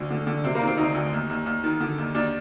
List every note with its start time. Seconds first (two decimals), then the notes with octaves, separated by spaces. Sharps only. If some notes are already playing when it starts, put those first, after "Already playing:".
Already playing: D2 D3
0.10 D3
0.27 D3
0.44 C3 C4
0.55 A#3
0.61 D#3
0.67 C4
0.77 D2 D#4
0.94 D2
1.13 D#2
1.29 D#2
1.46 D#2
1.64 D#3
1.80 D3
1.98 D#2
2.14 D#2 D4